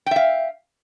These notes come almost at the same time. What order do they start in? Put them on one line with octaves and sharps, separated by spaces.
G5 E5 F5